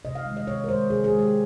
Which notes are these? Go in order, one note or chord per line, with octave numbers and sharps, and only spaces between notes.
C3 D#5
F5
D#3 G#3
D#5
C3 C#5
A#4
D#3 G#3 C5
C3 G#4
G#4
D#3 G#3
G4